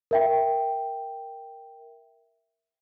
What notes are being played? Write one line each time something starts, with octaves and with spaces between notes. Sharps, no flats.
A#4 E5 G5